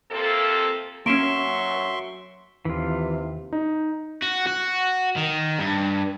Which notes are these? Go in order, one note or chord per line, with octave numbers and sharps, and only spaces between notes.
F2 C3 A#3 C4 A4
F#3 A#3 C#4 E5 C6 C#6 D7 E7
D#2 C3 E3 F4
D#4
F#4
F#4
D#3
G2